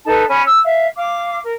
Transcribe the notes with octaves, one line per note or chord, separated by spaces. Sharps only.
D#4 A4 B4 A5
C#4 G#5 B5
E6
E5 F5
F5 D6
A#4